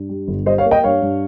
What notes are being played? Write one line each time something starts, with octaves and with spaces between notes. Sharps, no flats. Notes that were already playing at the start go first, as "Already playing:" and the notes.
Already playing: G2
G3
G1
G3 C5 D#5
C#5 F5
A#3
D#5 G5
G2 C#5 F5
G2